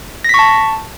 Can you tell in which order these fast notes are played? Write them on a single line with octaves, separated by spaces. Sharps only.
A#6 B6 C#6 A5